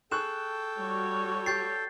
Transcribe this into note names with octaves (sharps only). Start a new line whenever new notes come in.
G#4 A4 G5 C#6 F#6 E7
G3 F#4 C#5
G4 G6 A6 C7